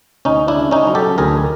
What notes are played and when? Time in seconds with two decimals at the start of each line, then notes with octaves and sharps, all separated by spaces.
0.25 D2 C#4 D#4
0.48 D4 E4
0.56 C#3
0.71 C#4 D#4
0.87 F#3
0.95 G4 A4
1.18 D2 G#4 A#4